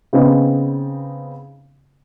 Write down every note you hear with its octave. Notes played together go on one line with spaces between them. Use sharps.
C#3 B3 C4 D#4